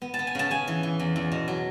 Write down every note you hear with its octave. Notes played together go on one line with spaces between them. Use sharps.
B3
A5
B3
G#5
C#3 A5
C#3 G#5
E3
E3
E2
E2
B2
F#3